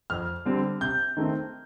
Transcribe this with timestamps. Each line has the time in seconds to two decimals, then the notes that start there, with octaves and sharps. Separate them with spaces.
0.10 F2 F6
0.45 D3 G3 C4
0.81 C3 G6
1.17 D#3 A3 C4